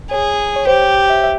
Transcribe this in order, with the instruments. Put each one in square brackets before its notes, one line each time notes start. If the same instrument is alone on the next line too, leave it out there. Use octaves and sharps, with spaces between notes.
[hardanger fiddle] G#4 [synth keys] C#5
[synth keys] C#5
[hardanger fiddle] G4 [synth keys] C5
[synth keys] C#5
E5
E5